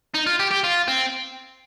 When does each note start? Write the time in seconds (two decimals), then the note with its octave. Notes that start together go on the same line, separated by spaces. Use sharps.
0.14 D#4
0.26 F4
0.40 G4
0.51 G4
0.64 F4
0.88 C4